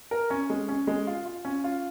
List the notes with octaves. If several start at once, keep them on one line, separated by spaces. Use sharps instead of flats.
A#4
C#4
G#3
C#4
G#3
F4
F4
C#4
F4